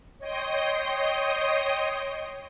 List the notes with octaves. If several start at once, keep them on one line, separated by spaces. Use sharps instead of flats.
C#5 D#5 G5 C6 D#6